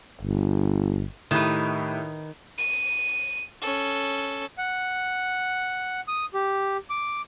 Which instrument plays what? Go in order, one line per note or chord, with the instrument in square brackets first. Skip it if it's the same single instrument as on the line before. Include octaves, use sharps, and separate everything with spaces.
[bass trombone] G1
[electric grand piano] A2 E4 G4 [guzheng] D#3 B4
[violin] D#7
C#4 A4
[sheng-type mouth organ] F#5
D#6
G4
D6